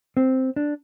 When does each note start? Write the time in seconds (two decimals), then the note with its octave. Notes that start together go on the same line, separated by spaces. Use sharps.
0.17 C4
0.56 D4